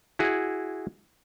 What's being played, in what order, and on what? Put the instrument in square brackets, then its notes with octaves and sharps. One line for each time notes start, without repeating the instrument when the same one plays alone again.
[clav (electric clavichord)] E4 F#4 G#4